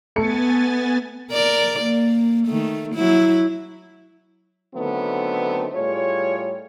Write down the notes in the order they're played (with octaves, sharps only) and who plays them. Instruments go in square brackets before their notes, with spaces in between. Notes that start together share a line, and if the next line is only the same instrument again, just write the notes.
[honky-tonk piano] A3 C#7 [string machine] B3 G#5 A6
[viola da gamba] A#4 D5
A#3
D#3 A3
F#3 E4
[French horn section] D3 D#3 F#3 A3 B3 C4
A2 G3 F4 G#4 C#5